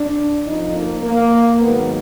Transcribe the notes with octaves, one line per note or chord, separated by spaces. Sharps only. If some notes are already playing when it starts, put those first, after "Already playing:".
Already playing: D4
F2 F3 D#4
A#3
A#3
G#2 D#3 F#3 B3